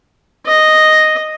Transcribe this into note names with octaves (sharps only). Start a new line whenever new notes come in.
D#5